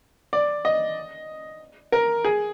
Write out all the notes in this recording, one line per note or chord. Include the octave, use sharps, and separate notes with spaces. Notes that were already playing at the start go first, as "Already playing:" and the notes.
D5
D#5
A#4
G#4